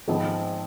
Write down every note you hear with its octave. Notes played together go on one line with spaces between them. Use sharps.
G#1 G#2 F3 B3